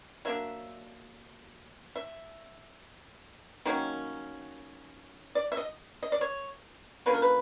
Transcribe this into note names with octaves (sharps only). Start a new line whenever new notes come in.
F#3 A#3 D4 E5
E5
D#3 F#3 A#3 C#4
D5
E5
D#5
D#5
D5
C#5
D3 F3 A#3 C#4 B4
A#4
B4